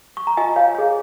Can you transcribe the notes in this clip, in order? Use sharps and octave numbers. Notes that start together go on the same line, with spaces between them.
C#6
A#5
F4 D#5 G#5
C#5 F5
G#4 C#5